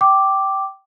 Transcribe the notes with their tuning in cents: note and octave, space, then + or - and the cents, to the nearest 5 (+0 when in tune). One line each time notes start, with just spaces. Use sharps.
G5 -15 D6 +0